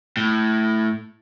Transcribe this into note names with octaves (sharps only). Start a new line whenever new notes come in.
A2